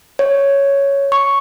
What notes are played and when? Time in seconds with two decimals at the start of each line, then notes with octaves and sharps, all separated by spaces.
0.19 C#5
1.12 C#6